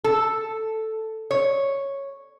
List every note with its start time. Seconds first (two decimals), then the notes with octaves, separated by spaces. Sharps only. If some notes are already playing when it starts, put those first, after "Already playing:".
0.04 A4
1.31 C#5